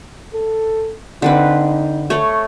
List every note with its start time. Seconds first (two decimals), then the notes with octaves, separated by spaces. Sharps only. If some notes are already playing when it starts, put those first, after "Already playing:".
0.34 A4
1.22 D3 C4 D#4 B4
2.10 A3 C#5